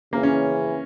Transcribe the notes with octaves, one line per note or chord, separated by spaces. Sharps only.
C#3 E3 A#3
C#4